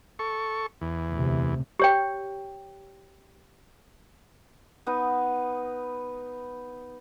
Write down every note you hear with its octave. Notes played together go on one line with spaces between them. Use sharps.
A4 C#6
E2
D2 C3
G4 C#5 G5
B3 D#4 B4